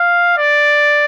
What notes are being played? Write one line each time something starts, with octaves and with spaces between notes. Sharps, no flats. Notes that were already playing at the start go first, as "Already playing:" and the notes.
Already playing: F5
D5